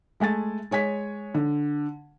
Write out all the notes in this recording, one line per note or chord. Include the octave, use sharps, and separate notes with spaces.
G#3 A3 G#5 A6
G#3 C#5 G#5 B6
D3